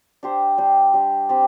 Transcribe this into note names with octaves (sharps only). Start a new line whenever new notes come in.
D4 G4 C5
G3 D4 G4
G3 D4 G4
G3 C4 G4 D5